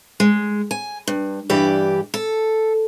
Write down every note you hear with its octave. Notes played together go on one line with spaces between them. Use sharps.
G#3
G#5
G2
G2 E3 G4 D5
A4